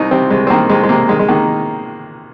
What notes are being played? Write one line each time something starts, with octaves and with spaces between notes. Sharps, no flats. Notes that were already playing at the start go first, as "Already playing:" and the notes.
Already playing: C2 D#4
C3 C4
C2 G#3
C4
D#3 A#3
C2 G#3
G#3
C3 A#3
D#3 G#3
G#3
D#3 A#3